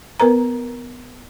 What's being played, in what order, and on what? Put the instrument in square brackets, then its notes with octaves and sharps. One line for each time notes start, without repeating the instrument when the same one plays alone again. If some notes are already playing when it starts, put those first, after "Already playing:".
[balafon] B3 A#4 B4 A#5